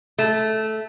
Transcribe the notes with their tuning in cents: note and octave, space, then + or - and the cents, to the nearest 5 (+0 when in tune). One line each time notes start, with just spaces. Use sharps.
A3 -10